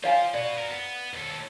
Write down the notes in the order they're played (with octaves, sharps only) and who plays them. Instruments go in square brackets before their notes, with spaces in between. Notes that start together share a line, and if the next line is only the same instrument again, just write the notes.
[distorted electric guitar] F4 C5 [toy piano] C#5 F5 G#5
[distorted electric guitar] F#4 B4 [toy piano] D5
[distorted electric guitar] F#4 A#4
B3
D#2 A4